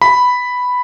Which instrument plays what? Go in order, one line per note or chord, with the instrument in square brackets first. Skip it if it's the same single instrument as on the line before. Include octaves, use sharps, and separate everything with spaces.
[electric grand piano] B5